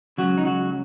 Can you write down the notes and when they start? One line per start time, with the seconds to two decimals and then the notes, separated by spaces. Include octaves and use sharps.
0.18 C#2 C#3 F#3 F#4
0.37 D#4
0.45 F#3 F#4